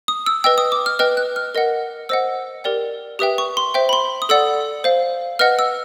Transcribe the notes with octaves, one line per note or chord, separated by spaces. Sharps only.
D#6
E6
B4 D#5 G5 E6
D#6
D6
F6
B4 D#5 G5 F6
F#6
F6
A#4 D#5 F#5
C5 D#5 F#5 E6
G4 A#4 D5 G5
G4 B4 E5 G5 D#6
C#6
C6
C5 E5 G5
B5
C6
D#6
A4 D5 F#5 E6
C5 F5
B4 D#5 F#5 F6
E6